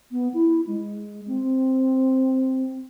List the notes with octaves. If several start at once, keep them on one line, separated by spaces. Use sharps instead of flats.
B3
E4
G#3
C4